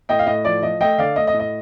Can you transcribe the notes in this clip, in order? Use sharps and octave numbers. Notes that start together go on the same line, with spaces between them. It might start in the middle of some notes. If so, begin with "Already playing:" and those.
A2 D#5 G5
F5
A2 D#5
F3 D5
F3 D#5
A3 D#5 G5
D3 D5 F5
A3 D#5
D#5
A2
D#5